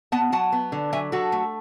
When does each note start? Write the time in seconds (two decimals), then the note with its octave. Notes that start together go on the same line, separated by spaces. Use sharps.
0.12 B3 F#5 A5
0.32 F#3 F#5 A5
0.52 B3
0.72 D3
0.93 F#3 E5 G#5
1.12 F#3 F#4 A4
1.32 A3